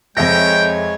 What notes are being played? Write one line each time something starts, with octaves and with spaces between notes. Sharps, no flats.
F2 G#3 C#5 E5 G5 A#6